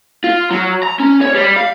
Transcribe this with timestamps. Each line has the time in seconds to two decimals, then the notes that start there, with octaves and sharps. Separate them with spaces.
0.24 F4
0.51 F#3
0.83 A#5
0.99 C#4
1.21 C#5
1.35 G3
1.56 F5